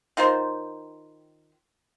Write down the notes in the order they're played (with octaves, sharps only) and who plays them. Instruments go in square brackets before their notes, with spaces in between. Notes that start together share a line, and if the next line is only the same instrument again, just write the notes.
[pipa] D#3 F4 A#4 C5